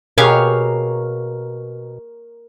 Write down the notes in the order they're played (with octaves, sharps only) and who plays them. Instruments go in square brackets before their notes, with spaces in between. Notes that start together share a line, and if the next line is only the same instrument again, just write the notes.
[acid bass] B2 [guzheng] G4 G#4 B4 [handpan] A#4 [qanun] C#5 F5